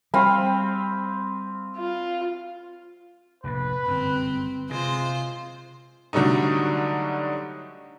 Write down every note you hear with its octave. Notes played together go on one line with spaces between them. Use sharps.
G3 C4 F5 B5 D6 D#6
F4
F1 A#1 A2 B4
G1 F#2 C4
C3 G#3 F4 C5
D3 F#3 G3 A3 D#4